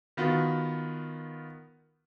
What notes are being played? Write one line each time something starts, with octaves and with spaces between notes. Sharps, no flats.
D#3 B3 F4 F#4